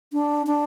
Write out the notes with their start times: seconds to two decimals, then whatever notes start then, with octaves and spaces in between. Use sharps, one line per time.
0.13 D4
0.47 D4